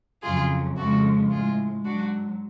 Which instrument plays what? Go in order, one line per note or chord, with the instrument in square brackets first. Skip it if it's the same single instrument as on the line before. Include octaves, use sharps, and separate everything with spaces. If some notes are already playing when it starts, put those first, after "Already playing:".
[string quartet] F2 C#3 F#3 F4 G#4
F2 C#3 F3 G#3 F#4 A4
A2 G#3 F4 G#4
G#2 F#3 D4 F#4